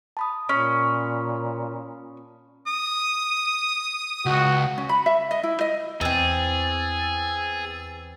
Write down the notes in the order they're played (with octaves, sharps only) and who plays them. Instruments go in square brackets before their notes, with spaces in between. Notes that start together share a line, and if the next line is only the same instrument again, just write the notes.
[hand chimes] A5 B5 D#6
[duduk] A#2 [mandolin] C#4
[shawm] D#6
[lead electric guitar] C#2 [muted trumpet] F#4
[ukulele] C#4
B5
E5
D#5
E4
D#5
[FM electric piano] E2 E6 A6 [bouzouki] E3 C4 [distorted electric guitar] G#4